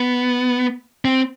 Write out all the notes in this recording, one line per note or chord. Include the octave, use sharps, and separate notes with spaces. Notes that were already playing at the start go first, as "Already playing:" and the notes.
Already playing: B3
C4